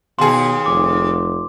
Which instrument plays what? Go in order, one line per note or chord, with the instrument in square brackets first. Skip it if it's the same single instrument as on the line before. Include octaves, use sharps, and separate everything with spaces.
[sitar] D#2 G#4 [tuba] B2 [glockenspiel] C6
[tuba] F1 [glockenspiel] D6